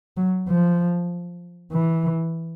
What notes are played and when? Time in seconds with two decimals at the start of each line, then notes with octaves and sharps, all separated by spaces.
0.17 F#3
0.48 F3
1.72 E3